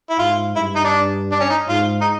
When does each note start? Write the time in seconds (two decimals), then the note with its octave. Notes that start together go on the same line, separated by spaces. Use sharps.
0.10 E4
0.19 G#2 F4
0.56 G2 E4
0.75 D#4
0.84 D4
1.32 D4
1.40 C#4
1.50 D#4
1.69 G#2 F4
2.01 D#4